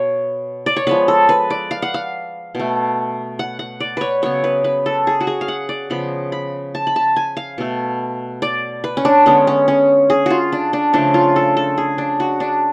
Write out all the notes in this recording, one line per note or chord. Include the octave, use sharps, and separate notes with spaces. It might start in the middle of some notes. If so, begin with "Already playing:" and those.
Already playing: B2 C#5
D5
C#5
F3 G#3 B3 B4
A4
B4
D5
F5
F#5
F5
B2 A3
F#5
F#5
D5
B4 C#5
C#3 F#3 B3 C#5
B4
B4
A4
G#4
F#4
G#4
F5
F#5
D5
C#3 F3 B3 B5
B5
A5
B5
A5
G#5
F5
B2 A3
D5
B4
C#4
D4
D3 G#3 B3 C#4
C#4
C#4
G#4
F4 F#4
D4
D4
C#3 F3 A3 D4
F4
A4
A4
G#4
D4
F#4
D4